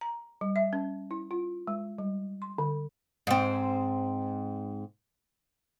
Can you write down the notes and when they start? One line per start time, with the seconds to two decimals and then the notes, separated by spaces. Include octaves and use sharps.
0.01 A#5
0.41 G3
0.56 E5
0.73 C#4
1.11 E4
1.31 F4
1.67 G#3
1.98 G3
2.42 C6
2.58 D3
3.27 G#2 C4